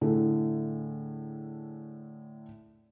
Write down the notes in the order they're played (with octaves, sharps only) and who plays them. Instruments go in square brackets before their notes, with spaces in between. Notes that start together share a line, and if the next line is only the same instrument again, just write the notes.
[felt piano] A2 D3 A3 E4 G#4